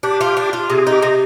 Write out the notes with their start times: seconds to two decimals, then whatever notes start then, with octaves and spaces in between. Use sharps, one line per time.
0.03 D4 G4
0.21 F4
0.37 D4
0.53 F4
0.70 C3 G#4
0.87 D#4
0.92 G4
1.02 C3